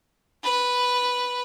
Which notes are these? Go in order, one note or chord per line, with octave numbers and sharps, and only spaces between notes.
B4